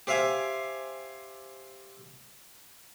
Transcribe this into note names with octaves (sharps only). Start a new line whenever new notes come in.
G4 C5 E5 F5 G#5